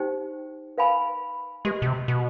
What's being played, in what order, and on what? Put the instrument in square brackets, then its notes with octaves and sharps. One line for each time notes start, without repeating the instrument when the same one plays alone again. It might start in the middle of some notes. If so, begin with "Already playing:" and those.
Already playing: [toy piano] D#4 G4 C5 G5
B4 F5 G#5 B5
[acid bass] G#3 [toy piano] G4 B4 D#5
[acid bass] B2
C3
B2